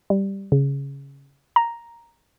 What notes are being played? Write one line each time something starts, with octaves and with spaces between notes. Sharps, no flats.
G3
C#3
A#5